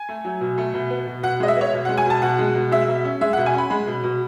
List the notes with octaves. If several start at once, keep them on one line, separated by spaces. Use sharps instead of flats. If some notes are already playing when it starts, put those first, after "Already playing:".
Already playing: G#5
A3
F#3
B2
A3
B2
B3
B2
B2 F#5
G#3 D#5
E5
B3 C#5
B2
F#5
G#3
G#5
B2 A5
B2 F#5
G#3
B2
G#3 E5
B2
C#4
G#3 E5
F#5
B2
G#5
C#4 B5
G#3 B5
B2
B2